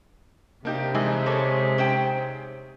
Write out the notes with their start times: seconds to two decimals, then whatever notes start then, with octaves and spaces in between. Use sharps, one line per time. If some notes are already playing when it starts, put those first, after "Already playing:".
0.65 C3 A#3 D4 D#4 G4 G6
0.95 E3 G#3 D#4 G#4
1.26 A#3 A4 C#5
1.78 C#4 C5 G5